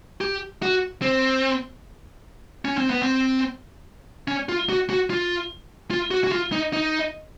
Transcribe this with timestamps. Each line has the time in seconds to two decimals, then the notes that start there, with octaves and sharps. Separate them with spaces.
0.21 G4
0.62 F#4
1.02 C4
2.65 C#4
2.78 C4
2.90 B3
3.02 C4
4.28 C#4
4.49 F4
4.69 F#4
4.90 F#4
5.10 F4
5.91 F4
6.11 F#4
6.24 F#4
6.32 F4
6.52 D#4
6.73 D#4